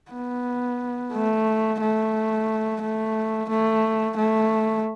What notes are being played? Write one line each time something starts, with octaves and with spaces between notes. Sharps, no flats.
B3
A3
A3
A3
A3
A3